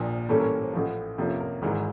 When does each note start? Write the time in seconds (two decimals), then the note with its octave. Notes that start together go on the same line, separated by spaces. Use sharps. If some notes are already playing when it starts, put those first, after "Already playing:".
Already playing: A#1 A#2 F3
0.29 A2 E3 G3 A#3 C#4 A4
0.40 A#4
0.62 C5
0.73 A1 A2 F3
1.18 F2 C3 F3 A#3 C#4
1.40 A#4
1.62 G#1 G#2 E3 A#4